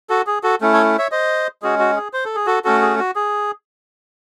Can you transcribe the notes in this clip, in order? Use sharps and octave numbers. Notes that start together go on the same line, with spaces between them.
F#4 A4
G#4
F#4 A4
A3 C#4 E4
A4 C#5
C#5 E5
C5 D#5
G#3 C#4 F#4 G#4
F#4
G#4
C5
A4
G#4
F#4 A4
A3 C#4 F#4 A4
G#4
F#4
G#4